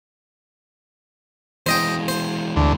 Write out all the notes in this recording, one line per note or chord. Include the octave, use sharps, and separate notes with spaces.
E3 G#3 C5 D#5 G5
C5
D2